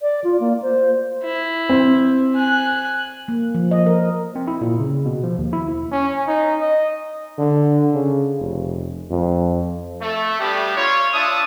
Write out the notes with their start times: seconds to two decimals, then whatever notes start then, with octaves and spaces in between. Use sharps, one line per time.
0.02 D5
0.24 F4
0.40 A#3
0.62 C5
1.24 E4
1.69 C4
2.35 G#5 F#6
3.28 A#3
3.54 F3
3.71 D#5
3.87 A#4
4.35 C4
4.48 E4
4.61 A#2
4.80 C#3
5.06 B2
5.24 F3
5.38 D#2
5.53 E4
5.92 C#4
6.27 D#4
6.61 D#5
7.38 D3
7.94 C#3
8.40 F1
9.11 F2
10.01 A3
10.40 G3 A3 B3 D4 F#4 G4
10.76 F4 C#5
11.13 D4 F4 E5 A5 D#6